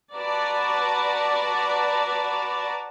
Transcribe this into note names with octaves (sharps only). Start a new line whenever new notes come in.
F#4 B4 D5 A5 A#5